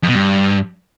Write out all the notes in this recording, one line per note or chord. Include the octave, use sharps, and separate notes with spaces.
F2
B2
G2